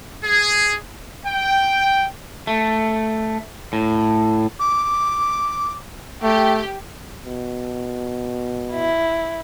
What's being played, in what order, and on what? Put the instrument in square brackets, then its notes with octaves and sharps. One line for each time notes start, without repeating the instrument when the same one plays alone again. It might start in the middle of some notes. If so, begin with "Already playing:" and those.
[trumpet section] G#4
G5
[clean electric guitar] A3
A2
[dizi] D6
[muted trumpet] A3 [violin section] G4
[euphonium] B2
[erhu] E4